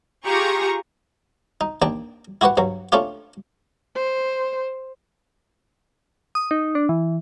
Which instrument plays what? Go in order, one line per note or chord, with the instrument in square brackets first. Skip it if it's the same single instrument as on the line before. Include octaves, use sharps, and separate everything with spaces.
[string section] F4 G4 G#4 A#5 C#6
[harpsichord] D#4
D#2 D4 G5
E4 F#4 G4 B4 F#5
G2 F#3
A3 C#4 D4 F4 G4
[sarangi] C5
[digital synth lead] D#6
D#4
D4
E3